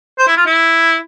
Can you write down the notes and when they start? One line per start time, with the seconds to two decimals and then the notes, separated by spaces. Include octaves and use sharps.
0.18 C5
0.28 E4
0.37 F4
0.46 E4